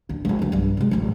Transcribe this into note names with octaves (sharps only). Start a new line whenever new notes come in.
A1 D2
G#1 F2
D2 F#3
B1 G2
C3 G#3
D1 A1